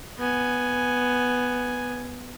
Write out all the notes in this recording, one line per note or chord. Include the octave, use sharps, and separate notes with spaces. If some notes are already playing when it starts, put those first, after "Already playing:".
B3 G#5